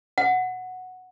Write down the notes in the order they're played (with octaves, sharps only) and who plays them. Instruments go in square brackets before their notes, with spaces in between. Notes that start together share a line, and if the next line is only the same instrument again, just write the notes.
[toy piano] F#5